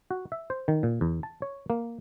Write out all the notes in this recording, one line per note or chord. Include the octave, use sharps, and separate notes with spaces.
F#4
E5
C5
D#3
A#2
E2
A5
C#5
A#3